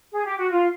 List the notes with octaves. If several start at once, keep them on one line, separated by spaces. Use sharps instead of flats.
G#4
G4
F#4
F4